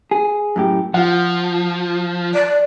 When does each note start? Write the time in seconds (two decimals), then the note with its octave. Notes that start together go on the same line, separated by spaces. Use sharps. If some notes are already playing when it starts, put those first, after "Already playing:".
0.11 G#4
0.56 F#2 A2 G4
0.94 F3 F4 F#5
2.34 D5